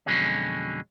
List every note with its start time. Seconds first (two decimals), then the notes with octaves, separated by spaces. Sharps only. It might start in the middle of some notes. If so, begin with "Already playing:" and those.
0.06 F2 B2 D3 F#3 G#3 C#4